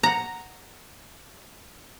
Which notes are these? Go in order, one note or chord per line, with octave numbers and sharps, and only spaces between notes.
F#5 A#5